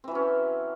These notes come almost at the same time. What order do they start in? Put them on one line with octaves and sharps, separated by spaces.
C4 E3 F#3 C#4